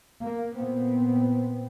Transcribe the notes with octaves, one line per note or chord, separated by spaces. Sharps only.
A#3
A#2 B3 C4